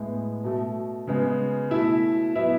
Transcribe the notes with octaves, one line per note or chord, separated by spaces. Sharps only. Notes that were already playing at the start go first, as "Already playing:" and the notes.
Already playing: A2 G#3 B3
B2 A3
C#3 G#3 B3
B2 A3 E4 E5
B2 F#3 B3 E4 E5